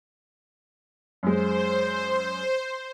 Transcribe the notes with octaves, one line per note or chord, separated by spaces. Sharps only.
F#2 G#3 C5